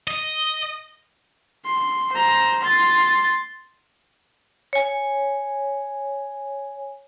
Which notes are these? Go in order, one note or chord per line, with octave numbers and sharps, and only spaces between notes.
D#5
C6
C5 A#5
C6 A6
C#5 G#5